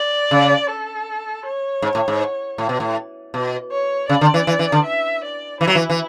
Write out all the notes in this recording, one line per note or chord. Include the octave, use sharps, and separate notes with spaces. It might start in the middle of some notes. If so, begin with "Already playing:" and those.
Already playing: D5
C#3
A4
C#5
G#2
A2
G#2
A2
B2
A2
B2
C#5
C#3 D5
D3
E3
E3
E3
D3
E5
D5
E3 E4
F#3
E3
E3